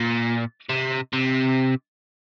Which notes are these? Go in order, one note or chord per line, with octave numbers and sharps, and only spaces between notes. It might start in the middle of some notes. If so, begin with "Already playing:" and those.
Already playing: A#2
C3
C3